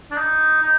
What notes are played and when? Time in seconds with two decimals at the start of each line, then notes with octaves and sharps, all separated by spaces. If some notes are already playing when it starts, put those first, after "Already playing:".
0.11 D4
0.17 D#4
0.62 D#4